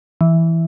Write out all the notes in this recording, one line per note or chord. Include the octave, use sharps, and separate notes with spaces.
E3